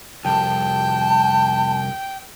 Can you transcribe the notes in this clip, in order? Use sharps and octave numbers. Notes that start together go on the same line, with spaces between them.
C2 F2 G5 A5